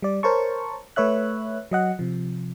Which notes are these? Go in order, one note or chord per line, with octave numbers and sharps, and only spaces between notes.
G3 D5
A#4 C5 C#5 A5 C#6
A3 B4 C#5 E5 F#6
F#3 D#5 F#5
C3 F3